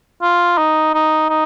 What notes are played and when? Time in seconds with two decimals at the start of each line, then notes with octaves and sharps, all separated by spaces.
0.22 F4
0.58 D#4
0.94 D#4
1.29 D#4